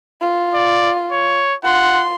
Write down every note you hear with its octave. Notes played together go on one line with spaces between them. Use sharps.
F4
D5
C#5
F4 F#5 C6